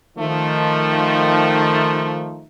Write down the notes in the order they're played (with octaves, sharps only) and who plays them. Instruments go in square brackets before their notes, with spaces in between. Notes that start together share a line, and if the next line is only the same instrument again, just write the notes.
[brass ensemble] D#3 F3 A3 D#4